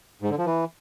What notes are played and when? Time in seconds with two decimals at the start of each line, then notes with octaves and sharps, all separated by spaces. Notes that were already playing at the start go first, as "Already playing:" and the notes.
0.22 G#2
0.30 D3
0.38 F3
0.46 E3